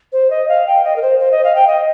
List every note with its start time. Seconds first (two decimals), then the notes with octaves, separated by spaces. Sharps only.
0.13 C5
0.30 D#5
0.49 F5
0.67 G5
0.84 D#5
0.96 A#4
1.02 C5
1.20 C5
1.32 D#5
1.44 F5
1.55 G5
1.67 D#5